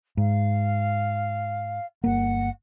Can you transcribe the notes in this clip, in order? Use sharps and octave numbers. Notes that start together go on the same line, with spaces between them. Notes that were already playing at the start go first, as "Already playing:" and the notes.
G#2 F5
G1 A#3 F#5